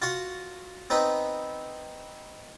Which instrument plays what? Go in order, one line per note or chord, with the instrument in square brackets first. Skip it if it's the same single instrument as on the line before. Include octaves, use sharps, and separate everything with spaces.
[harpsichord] F4 F#4 F#5
B3 C4 D#4 B4